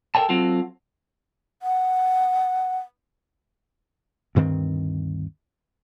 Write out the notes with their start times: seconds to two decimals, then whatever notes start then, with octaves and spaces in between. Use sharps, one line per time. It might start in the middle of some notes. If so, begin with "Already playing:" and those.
0.15 A4 A#4 C#5 G5 A5
0.29 F#3 C4 F4 F#4 A4
1.62 F#5
4.35 D2 G2 D#3 C4